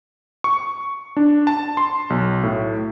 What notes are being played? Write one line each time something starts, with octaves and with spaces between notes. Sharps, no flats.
C#6
D4
A5
C6
B1
A2